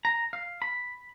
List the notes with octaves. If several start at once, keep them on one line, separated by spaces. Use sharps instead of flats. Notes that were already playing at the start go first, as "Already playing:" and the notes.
A#5
F5
B5